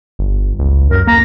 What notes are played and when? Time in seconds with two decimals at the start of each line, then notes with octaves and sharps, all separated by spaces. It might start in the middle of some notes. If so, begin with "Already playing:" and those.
0.19 G1
0.59 C#2
0.91 F#2 A#4
1.07 A#3 A#5